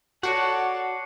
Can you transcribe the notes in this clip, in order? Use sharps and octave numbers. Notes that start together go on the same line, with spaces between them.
F#4 A4 C#5 D5 F#5 C#6 C7 C#7